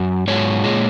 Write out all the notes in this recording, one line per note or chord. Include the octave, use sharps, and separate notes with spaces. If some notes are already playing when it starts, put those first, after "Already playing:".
Already playing: F#2
G#2 F#3 C#5
A#2 G#3